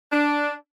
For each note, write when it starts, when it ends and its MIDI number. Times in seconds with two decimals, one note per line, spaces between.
0.13 0.54 62